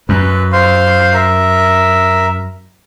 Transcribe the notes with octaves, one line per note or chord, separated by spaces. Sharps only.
F#2 B4
C5 F5 C6
A#4 E5